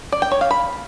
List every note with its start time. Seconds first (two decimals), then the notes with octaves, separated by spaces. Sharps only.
0.12 D5
0.22 G5
0.31 C#5
0.41 F5
0.51 B5